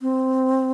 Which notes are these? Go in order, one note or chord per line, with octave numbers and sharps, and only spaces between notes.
C4